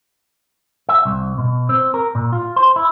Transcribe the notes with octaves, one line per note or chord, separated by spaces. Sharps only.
E5
C2
B2
C4
A#4
A#2
F4
C5
E4